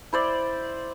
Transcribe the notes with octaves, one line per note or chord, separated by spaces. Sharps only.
E4 C5 D5